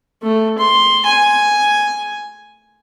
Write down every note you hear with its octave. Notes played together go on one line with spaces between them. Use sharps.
A3
C6
G#5